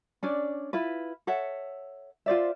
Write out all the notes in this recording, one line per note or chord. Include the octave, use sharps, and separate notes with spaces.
C#4 D4 D5
E4 F4 B4
A4 C#5 E5 F#5
F4 C5 D5 E5